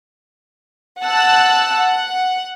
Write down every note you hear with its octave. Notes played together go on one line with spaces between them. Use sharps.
F#5 A5 E6 F#6
F#5